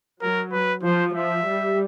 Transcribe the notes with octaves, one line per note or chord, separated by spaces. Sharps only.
F#3 A#4
B4
F3 C5
F3 E5
G3